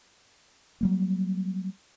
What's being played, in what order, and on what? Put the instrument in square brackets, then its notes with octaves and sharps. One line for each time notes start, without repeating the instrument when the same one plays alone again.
[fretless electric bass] F#3 G3 A#3